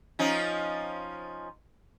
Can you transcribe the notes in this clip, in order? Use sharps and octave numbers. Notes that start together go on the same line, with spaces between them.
F3 C#4 D#4